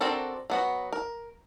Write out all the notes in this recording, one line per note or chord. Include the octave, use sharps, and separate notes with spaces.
C4 D4 F#4 A4 A#4
F#3 B3 F#4
A#4